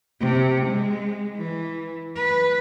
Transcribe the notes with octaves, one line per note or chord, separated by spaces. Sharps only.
C3
G#3
E3
B4